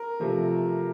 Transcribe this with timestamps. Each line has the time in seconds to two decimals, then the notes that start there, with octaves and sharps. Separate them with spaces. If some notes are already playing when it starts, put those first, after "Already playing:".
Already playing: A#4
0.20 C3 F3 A3